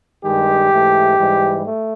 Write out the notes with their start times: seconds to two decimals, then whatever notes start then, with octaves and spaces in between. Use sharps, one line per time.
0.24 G2 D#3 G#3 G4
0.71 G#2 E3 A3
1.19 G#2 E3 G3
1.65 A3